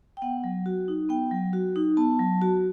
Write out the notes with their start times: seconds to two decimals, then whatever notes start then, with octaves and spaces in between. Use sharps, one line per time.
0.17 G5
0.22 B3 F#5
0.44 F#3
0.66 F#4
0.88 D#4
1.09 B3 G5
1.31 F#3
1.53 F#4
1.76 D#4
1.97 B3 A5
2.19 F#3
2.42 F#4